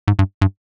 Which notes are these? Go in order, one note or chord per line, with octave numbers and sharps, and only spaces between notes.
G#2
G2
G2